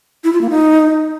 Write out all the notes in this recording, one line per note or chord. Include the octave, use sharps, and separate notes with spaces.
E4
F4
A#3
D#4